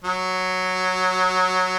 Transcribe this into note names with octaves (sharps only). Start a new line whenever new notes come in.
F#3